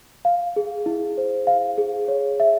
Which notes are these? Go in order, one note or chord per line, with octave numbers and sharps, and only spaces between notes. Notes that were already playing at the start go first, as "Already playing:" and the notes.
F5
G#4
E4
C5
F5
G#4
C#5
E5